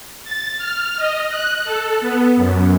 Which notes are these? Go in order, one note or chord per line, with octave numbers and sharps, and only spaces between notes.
A6
F6
D#5
F#6
A4
B3
F#2